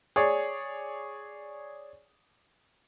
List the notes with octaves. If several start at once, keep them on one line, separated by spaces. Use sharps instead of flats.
G#4 C#5 D5